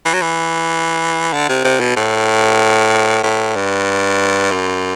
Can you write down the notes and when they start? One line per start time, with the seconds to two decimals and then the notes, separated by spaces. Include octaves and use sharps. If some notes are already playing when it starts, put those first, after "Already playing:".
0.06 E3
0.14 F#3
0.22 E3
1.33 D3
1.49 C3
1.64 C3
1.80 B2
1.97 A2
3.24 A2
3.56 G2
4.51 F#2